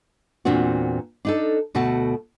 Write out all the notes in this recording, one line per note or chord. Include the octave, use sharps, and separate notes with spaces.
E2 A#2 C4 D4 F#4
D4 D#4 A4
D2 B2 A3 F#4 A5